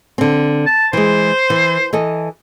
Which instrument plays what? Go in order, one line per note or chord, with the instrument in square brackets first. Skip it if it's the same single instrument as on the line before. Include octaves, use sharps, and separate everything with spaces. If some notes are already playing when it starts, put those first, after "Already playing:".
[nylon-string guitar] D3 C4
[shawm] A5
[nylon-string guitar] E3 G#3 [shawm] C5
[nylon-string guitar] E3
E3 A4 D#5